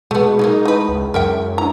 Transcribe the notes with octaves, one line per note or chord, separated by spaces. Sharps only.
B2 G#3 A3 B3
F#3 A3 A#3 D#4
A3 E4 B4
C#2
F#2 A#4 E5 G5
D4 E4 A#5